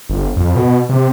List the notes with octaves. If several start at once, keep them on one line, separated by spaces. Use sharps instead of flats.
G1
F2
B2
C3